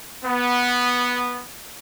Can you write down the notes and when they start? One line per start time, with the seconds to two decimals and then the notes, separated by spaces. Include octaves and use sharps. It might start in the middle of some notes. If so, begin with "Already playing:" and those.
0.24 B3